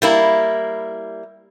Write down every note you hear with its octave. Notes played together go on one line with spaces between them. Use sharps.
G3 A#3 E4